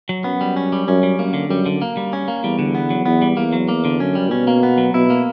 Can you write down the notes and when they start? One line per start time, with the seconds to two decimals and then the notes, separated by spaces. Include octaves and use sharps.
0.09 F#3
0.24 F#2 B3
0.41 G3
0.56 C#4
0.72 G3
0.87 F#2 C#4
1.03 G3
1.18 F#2 A#3
1.34 D3
1.49 F#2 G3
1.66 D3
1.82 A#3
1.97 G3
2.13 C#4
2.28 A#3
2.43 E2 G3
2.59 D3
2.75 B3
2.90 F#3
3.06 E2 B3
3.22 G3
3.37 E2 A#3
3.53 F#3
3.68 A#3
3.85 D3
4.00 F#2 C#4
4.15 G3
4.31 B2 C#4
4.47 A#3
4.63 B3
4.78 F#3
4.94 B2 E4
5.10 A#3